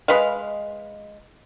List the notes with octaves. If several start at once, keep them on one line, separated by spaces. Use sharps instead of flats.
G#3 B4 D#5 F5